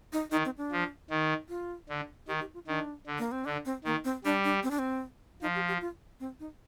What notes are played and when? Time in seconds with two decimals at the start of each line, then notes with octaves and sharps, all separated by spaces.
0.13 D#4
0.31 D#3 D#4
0.45 C4
0.57 D4
0.72 F3
1.10 D#3
1.49 F4
1.89 D3
2.27 D#3 G4
2.41 G4
2.54 F4
2.67 D#3 D4
3.06 D3
3.19 A#3
3.32 C4
3.45 D3 D4
3.65 C4
3.84 D#3 A#3
4.05 C4
4.24 G3 D4
4.44 D4
4.63 C4
4.71 D4
4.79 C4
5.42 F3 D#4
5.55 G4
5.68 G4
5.81 F4
6.20 C4
6.40 D#4